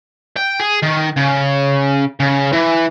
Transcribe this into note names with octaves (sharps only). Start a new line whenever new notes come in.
G5
G#4
D#3
C#3
C#3
E3